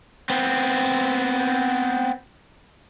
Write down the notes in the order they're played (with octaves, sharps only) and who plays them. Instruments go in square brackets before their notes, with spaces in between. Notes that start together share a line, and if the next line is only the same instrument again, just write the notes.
[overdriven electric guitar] B3 C4